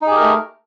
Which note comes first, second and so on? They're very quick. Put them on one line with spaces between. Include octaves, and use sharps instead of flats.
D#4 G#4 G4 A#4 A3